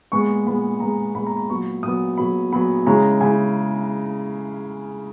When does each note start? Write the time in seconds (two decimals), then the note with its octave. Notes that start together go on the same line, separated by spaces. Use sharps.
0.12 A#2 G#3 B3 C#6
0.46 A#2 G#3 B3 B5
0.80 A#2 G#3 B3 A#5
1.15 A#2 G#3 B3 B5
1.27 A#5
1.37 B5
1.49 A#2 F#3 B3 C#6
1.83 A#2 F#3 B3 D#6
2.17 A#2 F#3 B3 B5
2.52 A#2 F#3 B3 B5
2.86 C#3 G#3 C#4 E4 A#5
3.21 C#3 G#3 C#4 E4 G#5